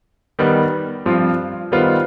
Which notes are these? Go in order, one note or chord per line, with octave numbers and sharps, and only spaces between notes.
D#3 G3 B3
G2 F3 C4 F4
D#3 G3 B3 F4 C5